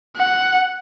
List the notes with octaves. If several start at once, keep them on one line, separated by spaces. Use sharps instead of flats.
F#5